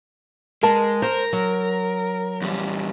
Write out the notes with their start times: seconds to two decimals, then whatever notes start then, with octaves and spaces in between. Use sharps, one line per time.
0.63 G#3 A#4 A5
1.02 A#4 C5
1.33 F#3
2.42 E2 G3